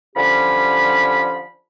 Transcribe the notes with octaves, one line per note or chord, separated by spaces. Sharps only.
D3 F3 C#4 G4 B5